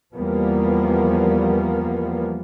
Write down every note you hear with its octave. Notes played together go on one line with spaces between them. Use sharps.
E2 F3 G3 A#3 B3